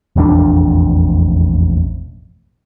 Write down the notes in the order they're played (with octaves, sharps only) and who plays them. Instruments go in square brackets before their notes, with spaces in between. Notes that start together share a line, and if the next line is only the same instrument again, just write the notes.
[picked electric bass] E1 A1 F2 D4